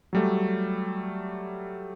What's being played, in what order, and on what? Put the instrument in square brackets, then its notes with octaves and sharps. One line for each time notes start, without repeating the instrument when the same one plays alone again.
[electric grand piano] F#3 G3 A3